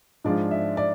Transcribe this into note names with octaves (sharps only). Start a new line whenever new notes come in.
G#2 F3 G#3 D4 F4 D5
E5
D5